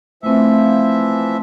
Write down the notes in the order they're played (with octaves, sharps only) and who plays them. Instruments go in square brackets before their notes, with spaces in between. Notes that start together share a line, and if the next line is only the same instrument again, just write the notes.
[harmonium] E3 F3 E5 [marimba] A3 C4